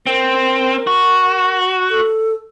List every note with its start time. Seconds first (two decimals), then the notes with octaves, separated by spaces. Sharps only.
0.07 C4 A#4
0.87 F#4
1.90 A4